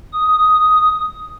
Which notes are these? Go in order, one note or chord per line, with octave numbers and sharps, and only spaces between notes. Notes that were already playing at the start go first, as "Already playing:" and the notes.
D#6